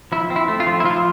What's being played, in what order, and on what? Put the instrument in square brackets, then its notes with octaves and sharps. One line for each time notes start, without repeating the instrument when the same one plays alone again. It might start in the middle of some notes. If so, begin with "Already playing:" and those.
[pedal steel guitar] F3 E4
C4
E4
A3
F4
F3
E4
F3 F4